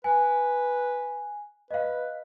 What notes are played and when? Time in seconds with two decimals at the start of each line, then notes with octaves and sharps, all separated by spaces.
0.04 B4 G#5
1.71 B4 D#5 F5